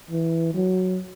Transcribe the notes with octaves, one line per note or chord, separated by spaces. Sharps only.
E3
F#3